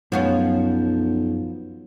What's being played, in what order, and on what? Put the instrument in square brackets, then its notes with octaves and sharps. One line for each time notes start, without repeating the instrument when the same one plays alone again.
[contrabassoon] B1 [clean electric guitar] F#2 [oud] F3 B3 C#4